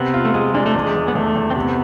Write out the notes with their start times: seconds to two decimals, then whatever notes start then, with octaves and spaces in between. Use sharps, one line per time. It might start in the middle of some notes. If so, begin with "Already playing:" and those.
Already playing: C3 B3
0.14 F4
0.25 A3
0.34 G#3 F4
0.54 G#3 D4
0.66 A3
0.75 E2 G#3
0.95 E2
1.08 B3
1.15 E2 A3
1.36 E2
1.50 C4
1.56 C3 B3